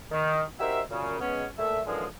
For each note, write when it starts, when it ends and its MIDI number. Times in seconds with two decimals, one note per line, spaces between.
0.12 0.42 51
0.60 0.81 63
0.60 0.81 66
0.60 0.81 67
0.60 0.81 70
0.60 0.81 72
0.60 0.81 76
0.90 1.18 42
0.90 1.18 46
0.90 1.18 49
1.20 1.45 56
1.20 1.45 59
1.20 1.45 61
1.58 1.80 46
1.58 1.80 57
1.58 1.80 76
1.86 2.06 42
1.86 2.06 46
1.86 2.06 50
1.86 2.06 52
1.86 2.06 53
1.86 2.06 56